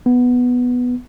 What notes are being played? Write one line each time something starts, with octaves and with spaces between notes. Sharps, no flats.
B3